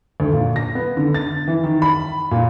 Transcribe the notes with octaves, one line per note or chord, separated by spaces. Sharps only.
D2
A#2
A#6
B3
D3
A6
E3
D#3
B5
A#2